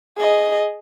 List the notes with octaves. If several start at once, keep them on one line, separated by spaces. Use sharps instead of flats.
G#4 D#5